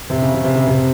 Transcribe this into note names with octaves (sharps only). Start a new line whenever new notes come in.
C3
C#3
C3
C3
C#3
C3